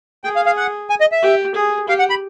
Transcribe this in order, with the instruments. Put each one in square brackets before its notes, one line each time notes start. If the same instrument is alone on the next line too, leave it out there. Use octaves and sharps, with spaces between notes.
[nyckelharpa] G#4 [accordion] G5
[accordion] F5
F5
F#5
G#5
D#5
E5
[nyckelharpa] G4
G#4
[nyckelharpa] G4 [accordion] F5
[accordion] F#5
B5